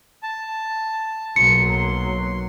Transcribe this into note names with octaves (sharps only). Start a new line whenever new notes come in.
A5
B1 F#3 A#3 C6 C#7